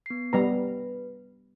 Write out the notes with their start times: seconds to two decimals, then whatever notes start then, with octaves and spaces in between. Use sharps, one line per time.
0.06 B3 C7
0.33 G3 B3 B4 A#5